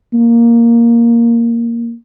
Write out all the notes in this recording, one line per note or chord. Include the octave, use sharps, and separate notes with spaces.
A#3